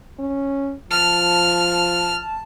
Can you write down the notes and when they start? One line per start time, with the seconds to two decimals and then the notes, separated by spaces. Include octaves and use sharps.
0.19 C#4
0.91 F3 A5 F6